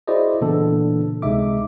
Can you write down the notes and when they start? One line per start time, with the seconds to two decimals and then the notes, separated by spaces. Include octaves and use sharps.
0.08 E4 F#4 G#4 C5 D5 D#5
0.41 A#2 C#3 E3 B3 D4 A4
1.22 C#2 C3 G#3 D#4 E5 D6